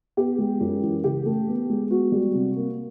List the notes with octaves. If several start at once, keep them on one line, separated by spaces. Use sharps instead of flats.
B3 G4
G#3
F#2
E3
C#3 G4
A3
B3
G#3
B3 F#4
G3
C3
A#3